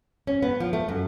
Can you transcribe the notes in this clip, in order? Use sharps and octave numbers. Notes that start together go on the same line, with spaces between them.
C#4
B3
F3
A3
F#2